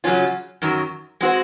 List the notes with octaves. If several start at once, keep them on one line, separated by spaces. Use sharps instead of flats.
C#3 F#3 C#4 F4
F#2 D#3 F#3
G#3 C4 F#4 C5